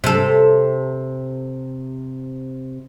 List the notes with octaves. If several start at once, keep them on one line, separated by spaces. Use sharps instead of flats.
C3 A4